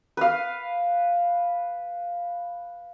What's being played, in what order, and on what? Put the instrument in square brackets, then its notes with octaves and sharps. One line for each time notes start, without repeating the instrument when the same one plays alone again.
[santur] B4 F5